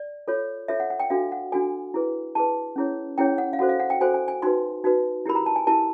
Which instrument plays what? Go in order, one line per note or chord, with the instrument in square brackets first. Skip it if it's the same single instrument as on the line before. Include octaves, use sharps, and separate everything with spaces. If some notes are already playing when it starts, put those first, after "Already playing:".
Already playing: [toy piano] D5
F4 A4 C#5
F4 A4 C#5 E5
F#5
F#5
G5
D4 F#4 A4 F5
F#5
D4 F#4 A4 G#5
E4 G#4 B4
E4 G#4 B4 A5
C#4 E4 G#4 C#5
C#4 E4 G#4 C#5 G5
F#5
F5
F#4 A4 C5 F#5
F5
F#5
G5
F#4 A4 C5 G#5
G#5
G#5
D#4 F#4 B4 C6
D#4 F#4 B4
E4 G4 A#4 B5
A#5
A5
G#5
E4 G4 A#4 A5